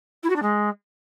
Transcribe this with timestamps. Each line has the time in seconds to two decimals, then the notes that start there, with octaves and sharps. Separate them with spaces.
0.23 E4
0.29 F#4
0.36 D4
0.42 G#3